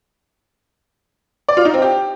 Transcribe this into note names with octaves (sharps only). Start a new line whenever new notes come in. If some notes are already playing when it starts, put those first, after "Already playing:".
D5
F4
D#4
C4
G4